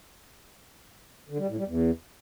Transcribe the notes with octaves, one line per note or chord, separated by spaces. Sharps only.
D3
G3
A2
G3
E2